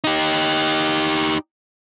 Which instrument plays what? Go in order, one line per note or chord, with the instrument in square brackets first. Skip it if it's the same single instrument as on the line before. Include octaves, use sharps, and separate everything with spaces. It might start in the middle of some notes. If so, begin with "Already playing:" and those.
[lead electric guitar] D#4 G4